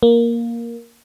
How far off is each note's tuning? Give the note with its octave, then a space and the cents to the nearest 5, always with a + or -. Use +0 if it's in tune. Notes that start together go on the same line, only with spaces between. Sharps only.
A#3 +5